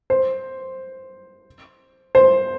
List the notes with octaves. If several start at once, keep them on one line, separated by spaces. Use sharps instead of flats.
C5
C5